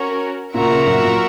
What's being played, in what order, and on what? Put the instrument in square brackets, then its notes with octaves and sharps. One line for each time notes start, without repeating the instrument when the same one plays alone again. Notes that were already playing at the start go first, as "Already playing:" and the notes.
Already playing: [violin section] C#4 F#4 A#4 C#5
[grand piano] A#2 C#3 [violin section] F#4 A#4 E5
[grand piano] A#2 C#3
F#2 A#2
F#2 A#2